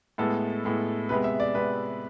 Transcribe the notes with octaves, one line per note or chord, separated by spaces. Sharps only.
A2 G#3 B3 A4
A2 G#3 B3
C3 G#3 B3 B4
E5
D5
C3 G#3 B3 B4